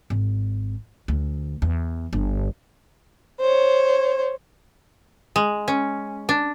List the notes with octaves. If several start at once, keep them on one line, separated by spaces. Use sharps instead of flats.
G#1
D2
E2
G1
C5 C#5
G#3
C#4
D4